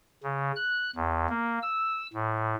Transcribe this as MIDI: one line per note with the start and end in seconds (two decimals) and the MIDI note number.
0.23 0.52 49
0.56 0.90 90
0.95 1.27 40
1.29 1.59 58
1.62 2.06 88
2.14 2.55 45